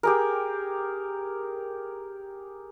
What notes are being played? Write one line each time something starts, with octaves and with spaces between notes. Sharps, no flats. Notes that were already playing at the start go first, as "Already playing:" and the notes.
G4 G#4 A#4